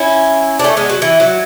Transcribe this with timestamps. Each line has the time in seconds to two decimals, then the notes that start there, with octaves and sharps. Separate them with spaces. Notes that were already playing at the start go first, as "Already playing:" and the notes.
Already playing: C#4 E4
0.59 D4
0.64 A3 C#4
0.77 G#3 B3
0.89 F#3
1.02 E3
1.20 F#3